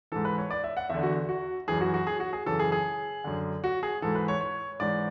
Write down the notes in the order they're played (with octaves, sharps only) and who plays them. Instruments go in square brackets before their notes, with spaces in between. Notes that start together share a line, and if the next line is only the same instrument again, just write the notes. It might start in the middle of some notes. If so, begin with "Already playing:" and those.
[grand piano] G#2 E3 A4
B4
C#5
D5
E5
F#5
E2 D3 E5
F#4
F#4
F#2 E3 G#4
F#4
F#4
G#4
F#4
G#4
F#2 C#3 E3 A4
G#4
G#4
F#2 D3
F#4
G#4
G#2 E3 A4
B4
C#5
C#5
G#2 E3 D5